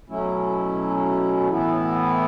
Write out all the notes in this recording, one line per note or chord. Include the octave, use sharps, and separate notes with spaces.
B2 F#3 A3 C#4 E4
A2 E3 B3 E4